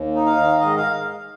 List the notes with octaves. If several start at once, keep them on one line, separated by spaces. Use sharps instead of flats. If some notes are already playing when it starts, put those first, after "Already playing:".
Already playing: D#2
D#4
F5
D#3
G#2 D#5
F5